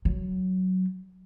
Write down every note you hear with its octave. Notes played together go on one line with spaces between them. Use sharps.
F#3